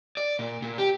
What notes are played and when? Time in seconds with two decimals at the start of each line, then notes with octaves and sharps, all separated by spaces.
0.17 D5
0.39 A#2
0.62 A#2
0.78 G4